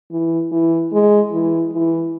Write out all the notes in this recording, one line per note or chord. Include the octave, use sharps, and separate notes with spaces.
E3
E3
G#3
E3
E3